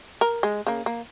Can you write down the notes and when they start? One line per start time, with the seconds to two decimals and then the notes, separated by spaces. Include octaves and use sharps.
0.21 A#4
0.43 G#3
0.67 C#3 A#3
0.86 A#3